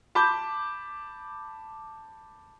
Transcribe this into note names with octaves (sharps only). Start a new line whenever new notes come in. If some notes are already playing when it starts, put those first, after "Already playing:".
A5 B5 D6 G6